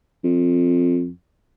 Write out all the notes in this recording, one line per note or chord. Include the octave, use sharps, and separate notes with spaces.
F2